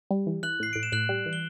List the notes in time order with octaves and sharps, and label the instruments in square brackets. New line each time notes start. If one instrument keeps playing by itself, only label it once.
[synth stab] G3
E3
[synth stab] E3 [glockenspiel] F#6 F#7
[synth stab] A2 [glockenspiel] C7
[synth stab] A2 [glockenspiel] D7
[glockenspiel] E7
[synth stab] A2 [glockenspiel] F#6 F#7
[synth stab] G3
E3
[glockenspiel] G7